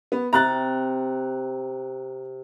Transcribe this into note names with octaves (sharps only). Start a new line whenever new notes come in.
B3
C3 A#5 F#6 A6